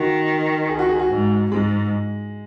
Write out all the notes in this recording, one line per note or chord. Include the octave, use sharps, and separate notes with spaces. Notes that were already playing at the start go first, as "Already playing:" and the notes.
Already playing: D#3 F#4
G#4
F#4
G#4
F#4
G#2
G#2 G#3